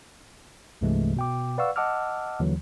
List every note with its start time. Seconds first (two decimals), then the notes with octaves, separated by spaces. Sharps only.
0.81 C2 G2 C3 E3 G#3 A3
1.16 B2 G5 D6
1.58 B4 D5 F5 F#5 C#6 E6
1.76 D#5 F#5 A5 D6 E6 F6
2.40 D#2 D3 E3 F#3